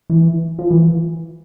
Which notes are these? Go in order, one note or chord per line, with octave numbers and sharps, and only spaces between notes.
E3
F3
E3